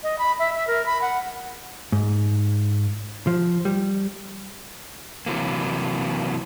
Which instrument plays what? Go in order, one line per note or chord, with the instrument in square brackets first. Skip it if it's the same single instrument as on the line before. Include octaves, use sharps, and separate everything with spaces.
[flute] D#5
B5
E5
E5
A#4
B5
F#5
[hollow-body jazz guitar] G#2
F3
G3
[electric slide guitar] C3 E3 F#3 A#3